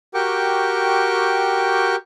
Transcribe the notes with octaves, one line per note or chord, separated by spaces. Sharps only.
F#4 G4 A#4 G5 C#6 D6